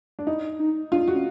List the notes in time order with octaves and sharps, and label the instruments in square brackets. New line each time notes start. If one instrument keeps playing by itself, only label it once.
[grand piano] D4
[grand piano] D#4 [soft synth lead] E4
[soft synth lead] D#4
[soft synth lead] D4 [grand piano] F4
[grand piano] F#4
[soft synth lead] C#4